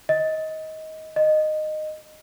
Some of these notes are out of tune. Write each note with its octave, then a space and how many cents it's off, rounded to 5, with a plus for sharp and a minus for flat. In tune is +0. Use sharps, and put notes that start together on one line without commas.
D#5 +20
D#5 -15